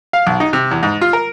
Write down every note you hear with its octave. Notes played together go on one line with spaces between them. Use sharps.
F5
B1
D#4
C3
E2
G#2
F4
A#4